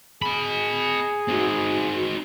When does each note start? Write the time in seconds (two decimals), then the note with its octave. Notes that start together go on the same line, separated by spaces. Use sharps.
0.22 G#4 D#5 B5
1.29 C4 D#4 F#4